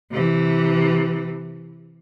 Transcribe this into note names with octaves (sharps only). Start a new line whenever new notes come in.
C3 E3